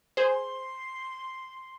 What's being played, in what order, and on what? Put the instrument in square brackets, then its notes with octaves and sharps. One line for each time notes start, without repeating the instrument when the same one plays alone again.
[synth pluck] G#4 C5 [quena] C6